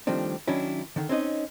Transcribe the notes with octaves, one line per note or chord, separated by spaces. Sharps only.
D#3 F3 G3 A3 C4 D4
D#3 F#3 C#4 D4 E4
D3 D#3
C4 C#4 D#4 D#5